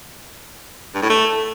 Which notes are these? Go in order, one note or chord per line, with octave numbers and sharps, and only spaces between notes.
G2
A2
A3